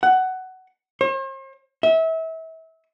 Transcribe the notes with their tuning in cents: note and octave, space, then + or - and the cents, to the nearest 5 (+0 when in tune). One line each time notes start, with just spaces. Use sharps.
F#5 +15
C5 +45
E5 -30